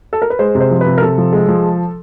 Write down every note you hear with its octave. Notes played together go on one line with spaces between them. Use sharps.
A4
A#4
B4
G#3 C5
C3
C5
F3
B4
C3
A#4
C3 A4
F3
G#3
F3